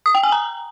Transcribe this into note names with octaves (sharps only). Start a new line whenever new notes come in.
D#6
G5
G#5
A#5